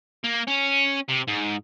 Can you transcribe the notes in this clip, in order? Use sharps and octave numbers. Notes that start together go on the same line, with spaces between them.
A#3
C#4
C3
G#2